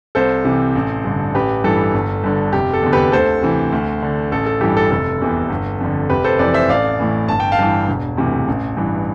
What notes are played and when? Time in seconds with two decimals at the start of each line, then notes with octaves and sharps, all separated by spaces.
0.15 C2 A4 C5
0.45 C3 E3
0.76 A1
1.05 G2 D3
1.34 A1 G4 B4
1.64 G2 E3 A4
1.94 G1
2.24 G2 D3
2.53 F1 G4
2.73 A4
2.82 E2 D3
2.93 G4 B4
3.12 D2 A4 C5
3.42 C3 E3
3.72 D2
4.02 D3
4.32 A1 A4
4.46 A4
4.61 G2 E3 G4
4.77 A4
4.90 F1 A4
5.21 E2 C3 E3
5.50 G1
5.81 F2 D3
6.09 F1 G4 B4
6.24 A4 C5
6.39 F2 E3 B4 D5
6.54 C5 E5
6.69 A1 D5 F5
6.99 A2 E3
7.28 G1 A5
7.40 G5
7.52 F5 A5
7.59 G2 E3
7.88 E1
8.17 D2 C3 E3
8.48 A1
8.77 G2 E3